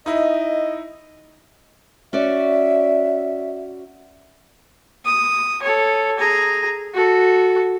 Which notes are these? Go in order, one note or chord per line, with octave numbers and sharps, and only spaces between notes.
D#4 E4 D#5
C#4 F#4 D5 E5
D#6
A4 C#5
G#4 A#5
F#4 A4